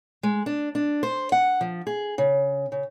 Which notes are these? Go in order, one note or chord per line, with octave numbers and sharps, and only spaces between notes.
G#3
D4
D4
C5
F#5
F3
G#4
C#3
C#3